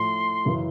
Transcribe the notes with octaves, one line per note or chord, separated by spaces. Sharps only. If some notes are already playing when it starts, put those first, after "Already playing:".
Already playing: A2 F3 A3 C6
F#2 C#3 E3